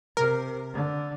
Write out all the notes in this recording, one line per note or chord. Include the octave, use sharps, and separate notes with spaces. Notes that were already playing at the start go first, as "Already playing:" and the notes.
C3 A#4
D3